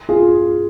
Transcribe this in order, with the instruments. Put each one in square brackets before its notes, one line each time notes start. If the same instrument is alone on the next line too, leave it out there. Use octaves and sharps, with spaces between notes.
[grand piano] F4 G#4